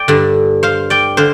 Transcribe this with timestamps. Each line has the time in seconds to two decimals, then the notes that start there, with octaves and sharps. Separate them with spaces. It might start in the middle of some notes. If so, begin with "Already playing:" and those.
Already playing: D5 G5
0.08 G2 D3
0.63 C5 F5
0.90 D5 G5
1.17 D3 C5 F5